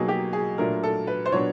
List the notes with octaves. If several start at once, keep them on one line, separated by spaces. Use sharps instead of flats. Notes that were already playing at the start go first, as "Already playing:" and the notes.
Already playing: B2 F#3 A#3 D#4 G#4
G4
G#4
A#2 F#3 A3 D4 A#4
A4
B4
C5
A#2 F#3 B3 D4 C#5